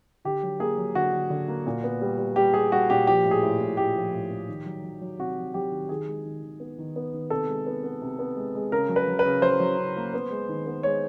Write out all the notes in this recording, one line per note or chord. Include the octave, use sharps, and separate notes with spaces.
D3 G4
F#3
A#3 G#4
F#3
D3 F#4
D3
D3
A#3
A#2
B3
G3
G3
G3 G4
G3 G#4
G3 F#4
A#2 G4
F3 G4
A2
G#4
A2
A2
A2 G4
F3
A2
A2
D#3
F#3
F#3
F#3
C3 F#4
F#3
F#3 G4
D#3
D#3 G#4
G#3
D#3
D#3
B3
D#3
B3
D#3
C3 A4
G#3
B3
B3
C3
B3
G#3
G#3
C#3 A#4
F#3
B4
F#3
B4
C#3
F#3 C5
F#3
C#3
A#3
B3
G#3
D#3
B3
G#3 C#5